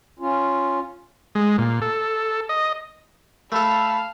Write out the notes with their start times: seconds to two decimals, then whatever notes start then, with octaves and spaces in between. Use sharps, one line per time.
0.19 C#4 F4
1.35 G#3
1.58 A#2
1.82 A4
2.49 D#5
3.52 A3 A4 F5 A5 B5